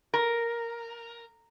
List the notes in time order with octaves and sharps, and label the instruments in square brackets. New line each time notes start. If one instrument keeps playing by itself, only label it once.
[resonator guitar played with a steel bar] A#4